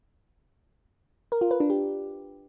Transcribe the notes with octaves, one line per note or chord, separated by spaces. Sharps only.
A#4
F4
B4
D4
G4